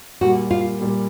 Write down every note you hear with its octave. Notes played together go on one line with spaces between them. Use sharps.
A#2 G3 A#3 F#4
F4
A#2 G3 A#3